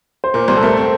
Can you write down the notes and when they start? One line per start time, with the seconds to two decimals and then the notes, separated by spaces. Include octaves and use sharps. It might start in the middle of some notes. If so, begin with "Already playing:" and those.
0.24 C5
0.34 A#2 A#4
0.48 C2 C5
0.57 A4
0.63 A3 A#4
0.77 C4